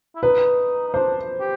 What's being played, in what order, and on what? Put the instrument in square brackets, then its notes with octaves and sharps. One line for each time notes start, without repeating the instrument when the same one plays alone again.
[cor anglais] E4
[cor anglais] D#4 [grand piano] B4
[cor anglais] D#4
[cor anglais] D4 [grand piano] C5
[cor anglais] G4